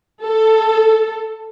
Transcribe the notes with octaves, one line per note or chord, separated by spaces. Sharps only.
A4